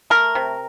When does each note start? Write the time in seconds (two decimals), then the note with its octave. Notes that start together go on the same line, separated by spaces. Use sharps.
0.10 A3 A#4
0.35 C3